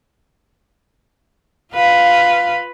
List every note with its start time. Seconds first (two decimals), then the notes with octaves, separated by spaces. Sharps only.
1.74 F4 B4 F5